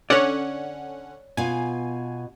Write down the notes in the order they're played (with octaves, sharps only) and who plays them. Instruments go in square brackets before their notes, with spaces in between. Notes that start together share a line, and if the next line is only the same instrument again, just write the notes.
[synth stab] D3 C#4 F#5 [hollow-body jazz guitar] C#5 D5
[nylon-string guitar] B2 F4 [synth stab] G#5